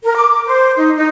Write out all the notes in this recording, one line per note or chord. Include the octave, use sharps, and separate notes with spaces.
A#4
D6
C5
D#4
D#4